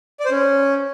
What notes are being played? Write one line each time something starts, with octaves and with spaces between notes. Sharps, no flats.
D5
C5
C#4